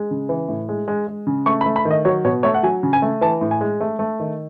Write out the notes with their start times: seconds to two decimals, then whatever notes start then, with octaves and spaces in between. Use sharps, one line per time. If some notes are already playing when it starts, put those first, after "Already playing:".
Already playing: G#3
0.11 C#3
0.29 E3
0.49 A2
0.69 G#3
0.88 G#3
1.07 G#3
1.27 C#3
1.46 A3 C#6
1.61 B5
1.66 A3
1.76 B5
1.85 D#3
1.91 D#5
2.05 F#3 C#5
2.25 B2 C#5
2.43 A3 C#5
2.54 F#5
2.63 F#3 G#5
2.83 C#3
2.93 G#5
3.02 A3
3.21 E3 A5
3.41 A2
3.51 G#5
3.61 G#3
3.80 A3
3.99 A3
4.20 D#3